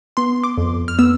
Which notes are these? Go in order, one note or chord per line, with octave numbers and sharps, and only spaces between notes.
B3 C6
D6
F2
F6
B3 E6